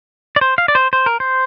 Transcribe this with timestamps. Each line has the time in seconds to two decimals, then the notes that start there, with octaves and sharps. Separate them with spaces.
0.36 D5
0.41 C5
0.58 F5
0.68 D5
0.75 C5
0.93 C5
1.06 A#4
1.20 C5